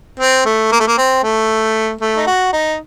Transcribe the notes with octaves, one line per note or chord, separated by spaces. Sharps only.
C4
A3
A#3
A3
A#3
C4
A3
A3
D#4
F#4
D#4